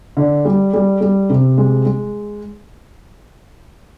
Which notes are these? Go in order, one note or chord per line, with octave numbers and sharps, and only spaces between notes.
D3
G3
G3
G3
C3
G#3
G#3